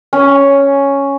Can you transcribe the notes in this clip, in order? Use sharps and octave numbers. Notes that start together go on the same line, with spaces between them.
C#4